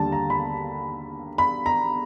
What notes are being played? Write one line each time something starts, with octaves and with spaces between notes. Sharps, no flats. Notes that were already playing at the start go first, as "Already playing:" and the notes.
Already playing: D#2 D3 G3 A5
A#5
B5
B5
A#5